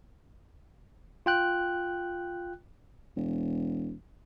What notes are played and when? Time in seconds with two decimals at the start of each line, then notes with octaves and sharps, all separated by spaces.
1.26 F4 G5 F#6
3.16 E1